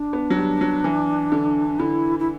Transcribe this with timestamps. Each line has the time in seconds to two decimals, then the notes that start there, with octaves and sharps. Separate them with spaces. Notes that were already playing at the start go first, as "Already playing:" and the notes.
Already playing: D4
0.13 B3
0.30 F#3
0.37 G3
0.61 F#3
0.84 E3
1.32 D3
1.79 D3 E4
2.19 E4